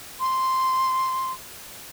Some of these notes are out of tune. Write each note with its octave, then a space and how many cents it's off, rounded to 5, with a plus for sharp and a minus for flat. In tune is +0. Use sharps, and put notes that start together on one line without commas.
C6 -5